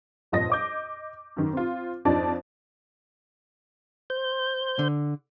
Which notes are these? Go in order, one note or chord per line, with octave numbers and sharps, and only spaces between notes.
G1 F2 A#2 D#5 D#6 A#6
D#5 D6 G6
F#2 D#3
C4 F4
F2 F3 D4 D#4 D5 A5
C5 G6
D3